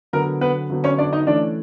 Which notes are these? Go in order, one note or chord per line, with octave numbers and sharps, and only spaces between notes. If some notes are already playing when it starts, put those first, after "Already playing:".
D3 F#3 B3 A#4
B3 B4
D3 F#3 B3
C#4 C#5
D4 D5
D#4 D#5
E3 A3 C#4 D4 D5